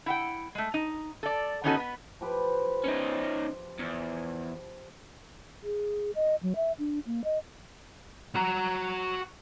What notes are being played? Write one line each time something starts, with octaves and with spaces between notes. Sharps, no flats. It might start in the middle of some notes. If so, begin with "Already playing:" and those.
E4 F#5 G5
G#3 A3
D#4
A4 D5
D#3 B3 C#4 D#4 F#4 A4
B3 B4
F3 G4 B4
C#4 D#4
E2
G#4
D#5
F#3
E5
D4
A#3
D#5
F#4 A#5